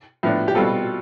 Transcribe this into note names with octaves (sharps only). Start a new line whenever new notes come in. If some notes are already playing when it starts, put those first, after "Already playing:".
A2 F3 B3 D4
G4
B2 G3 C4 F4 A4